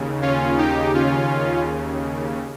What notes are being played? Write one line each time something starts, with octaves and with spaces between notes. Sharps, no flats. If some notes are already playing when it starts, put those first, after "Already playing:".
Already playing: D#2 C#3
C#4 F4
D#4 G4
C#4 F4